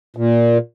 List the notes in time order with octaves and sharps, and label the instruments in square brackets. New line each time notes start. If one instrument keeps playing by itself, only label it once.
[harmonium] A#2